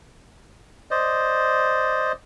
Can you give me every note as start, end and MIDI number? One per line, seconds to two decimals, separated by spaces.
0.91 2.12 72
0.91 2.12 74
0.91 2.12 75